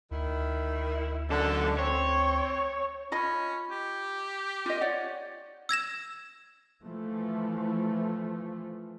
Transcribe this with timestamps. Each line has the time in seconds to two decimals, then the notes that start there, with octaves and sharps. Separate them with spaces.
0.11 D2 D#3 E4
1.30 F#2 D3 A4
1.79 C4 C#5
3.12 C#4 F4 D#5 B5
3.71 G4
4.66 F4 D#5
4.81 C#5 D5 F#5
5.69 E6 G#6 A#6 E7
6.83 E3 F3 A3